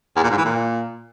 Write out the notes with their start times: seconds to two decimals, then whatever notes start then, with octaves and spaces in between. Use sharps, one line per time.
0.16 E2
0.23 A#2
0.31 G#2
0.38 E3
0.45 A#2